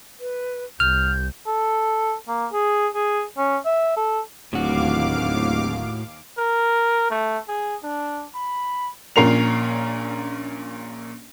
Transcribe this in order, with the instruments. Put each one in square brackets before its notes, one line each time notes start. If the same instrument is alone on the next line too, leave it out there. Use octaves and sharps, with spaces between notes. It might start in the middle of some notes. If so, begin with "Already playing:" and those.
[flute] B4
[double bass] C2 [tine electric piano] F6 [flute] G6
[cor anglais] A4
A#3
G#4
G#4
C#4
E5
A4
[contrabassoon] D1 [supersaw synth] D#2 F5 D6 [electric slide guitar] A2 F#4
[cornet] A#4
A3
G#4
D4
B5
[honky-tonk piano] A#1 A#2 C#4 A#4 C7 F7